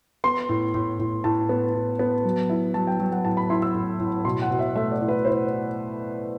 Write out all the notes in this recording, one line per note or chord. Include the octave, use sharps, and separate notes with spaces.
B3 C6
A2
A2
A2
A2 A5
B3
A2
B3
F#3
E4
F#3 A5
G5
F#3
F#5
A2 A5
B5
E4 C6
E6
A2
A2
B2 C6
F#5
B2
E5
A3 E5
D5
E4
B4
E4 C5